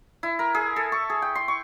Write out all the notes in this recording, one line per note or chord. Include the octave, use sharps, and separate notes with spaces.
E4
A#4
G#4
A4
C#6
G#4
G5
C6
C#6